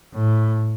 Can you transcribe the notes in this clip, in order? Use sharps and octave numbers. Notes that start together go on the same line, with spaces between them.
A2